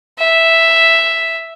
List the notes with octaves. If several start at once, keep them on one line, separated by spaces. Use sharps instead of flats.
E5